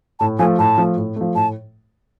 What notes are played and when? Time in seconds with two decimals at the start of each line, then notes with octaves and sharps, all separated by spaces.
0.20 A2 A5
0.39 F3 A3 G#5
0.59 A2 A5
0.78 F3 A3
0.97 A2
1.16 F3 A3
1.35 A2 A5